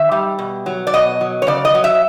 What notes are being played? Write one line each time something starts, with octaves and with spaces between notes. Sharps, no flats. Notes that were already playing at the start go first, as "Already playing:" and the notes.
Already playing: D#3 E5
G3
B2
F#3
D5
B2 D#5
F#3
C#5
C#3 D5
D#5
F#3
E5